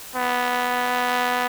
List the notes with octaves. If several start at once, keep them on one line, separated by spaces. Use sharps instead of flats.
B3